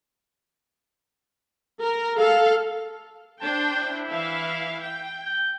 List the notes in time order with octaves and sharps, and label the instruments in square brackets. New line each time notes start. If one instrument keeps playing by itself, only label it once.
[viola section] A#4
A4 F5
[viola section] D4 C5 G5 [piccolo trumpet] A5
[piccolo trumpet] E4
[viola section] E3 E5 F5
G5
[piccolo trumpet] G6